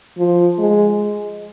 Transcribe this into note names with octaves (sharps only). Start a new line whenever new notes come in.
F3
G#3